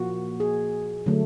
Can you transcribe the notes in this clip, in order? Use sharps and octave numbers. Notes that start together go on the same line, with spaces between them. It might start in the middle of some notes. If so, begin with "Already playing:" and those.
Already playing: A#2 F3 A#3 F#4
G#4
D3 F#3 A3